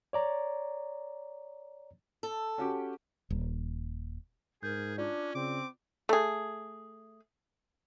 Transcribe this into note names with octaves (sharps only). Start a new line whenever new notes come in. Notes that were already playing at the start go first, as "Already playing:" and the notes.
C#5 D5 A#5
A4
C#4 F#4 G4
D#1
G#2 G#4 A#4 G6
C#4 D4 F4 D5
C#3 C4 D6
A3 G#4